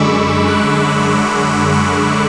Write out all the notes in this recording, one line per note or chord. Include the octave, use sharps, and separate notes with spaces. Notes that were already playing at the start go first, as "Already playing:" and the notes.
Already playing: F#2 D3 G#3 B5 C#6 D6 E6
D6 F#6
C#6 E6